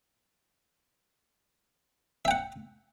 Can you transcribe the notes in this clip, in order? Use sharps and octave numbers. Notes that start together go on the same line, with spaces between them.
E5 F#5 G5